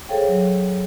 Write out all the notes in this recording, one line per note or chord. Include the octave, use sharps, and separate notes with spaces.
G#4 A4 C5 C#5 F5 G5
F#3